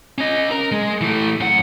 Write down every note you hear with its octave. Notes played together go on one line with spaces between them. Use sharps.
C#4 D#5
A#4
G#3
E3 A3
F#2 F#5